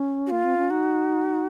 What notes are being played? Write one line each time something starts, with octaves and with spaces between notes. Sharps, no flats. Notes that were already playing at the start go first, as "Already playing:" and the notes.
Already playing: C#4
F#4
A#3 F4
C4
C#4
D#4 F#4